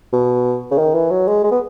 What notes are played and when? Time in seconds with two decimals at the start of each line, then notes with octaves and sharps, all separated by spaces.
0.13 B2
0.71 C#3
0.78 D#3
0.94 E3
1.11 F#3
1.27 G#3
1.44 G#3
1.51 B3